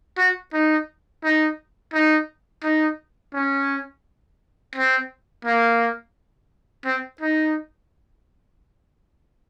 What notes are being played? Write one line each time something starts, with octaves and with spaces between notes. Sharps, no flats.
F#4
D#4
D#4
D#4
D#4
C#4
C4
A#3
C4
D#4